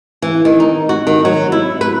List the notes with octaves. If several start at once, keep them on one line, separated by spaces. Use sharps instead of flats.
E3
D#3
D#4
F#4
D#3
F#3
E4
B4